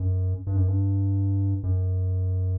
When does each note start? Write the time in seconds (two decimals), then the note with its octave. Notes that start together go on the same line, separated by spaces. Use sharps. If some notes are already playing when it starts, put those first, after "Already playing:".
Already playing: F#2
0.47 G2
0.56 F#2
0.68 G2
1.64 F#2